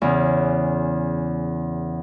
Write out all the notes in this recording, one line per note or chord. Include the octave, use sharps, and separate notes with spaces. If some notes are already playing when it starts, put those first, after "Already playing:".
E2 C#3